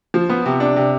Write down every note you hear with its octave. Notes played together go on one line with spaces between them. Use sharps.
F3
B3
C3
D4
C3